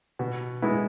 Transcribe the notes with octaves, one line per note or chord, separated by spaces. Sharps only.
B2
G#3 B3 E4